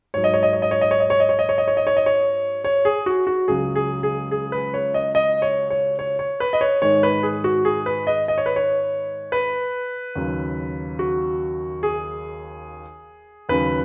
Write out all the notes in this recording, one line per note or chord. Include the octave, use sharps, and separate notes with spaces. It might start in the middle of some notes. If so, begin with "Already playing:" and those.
G#2 F#3 C#5
D#5
C#5
D#5
C#5
D#5
C#5
D#5
C#5
D#5
C#5
D#5
C#5
D#5
C#5
D#5
C#5
D#5
C#5
D#5
C#5
C#5
G#4
F#4
F#4
C#2 C#3 F#3 G#4
G#4
G#4
G#4
B4
C#5
D#5
D#5
C#5
C#5
C#5
C#5
B4
D#5
C#5
G#2 D#3 G#3 C#5
B4
G#4
F#4
G#4
B4
D#5
D#5
C#5
B4
C#5
B4
D#2 C#3 F#3
F#4
G#4
D#2 C#3 F#3 B4